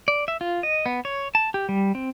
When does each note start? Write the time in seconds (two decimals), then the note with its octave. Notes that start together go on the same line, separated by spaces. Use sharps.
0.08 D5
0.28 E5
0.41 F4
0.63 D#5
0.86 B3
1.05 C#5
1.35 A5
1.54 G4
1.69 G3
1.95 C4